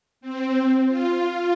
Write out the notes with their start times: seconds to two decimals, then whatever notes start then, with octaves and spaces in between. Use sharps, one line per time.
0.21 C4
0.88 F4